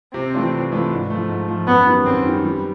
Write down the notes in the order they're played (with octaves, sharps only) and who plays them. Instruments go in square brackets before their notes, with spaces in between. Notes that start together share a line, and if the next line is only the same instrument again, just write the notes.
[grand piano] C3 [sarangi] C4
[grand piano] E3 A3 D4 F4
C3
E3 A3 D4 F4
G#2
F3 A3
G#2
F3 A3
[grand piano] F#2 [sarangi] B3
[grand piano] D#3 G3
[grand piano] F#2 [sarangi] C4
[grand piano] D#3 G3
G3